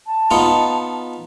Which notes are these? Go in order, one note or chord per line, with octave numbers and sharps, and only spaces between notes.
A5
B3 D#4 F4